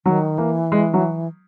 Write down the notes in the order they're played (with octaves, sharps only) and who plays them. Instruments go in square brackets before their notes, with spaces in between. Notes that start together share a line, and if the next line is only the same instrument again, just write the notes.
[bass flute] D#3 [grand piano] F#3
[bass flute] E3 [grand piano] A#3
[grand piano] G#3
F#3